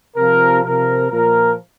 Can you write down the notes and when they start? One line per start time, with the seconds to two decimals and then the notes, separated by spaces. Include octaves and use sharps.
0.17 C3 F3 A#4
0.64 C3 F3 A#4
1.10 A#2 F3 A#4